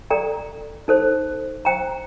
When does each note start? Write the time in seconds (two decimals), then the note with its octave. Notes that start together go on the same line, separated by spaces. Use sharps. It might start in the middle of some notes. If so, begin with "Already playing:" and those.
0.10 A4 D5 G5 A#5
0.88 D#4 A4 C5
1.65 C5 G5 A#5